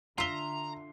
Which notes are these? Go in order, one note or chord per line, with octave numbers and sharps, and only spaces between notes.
D3 F4 E5 A#5 C7 G7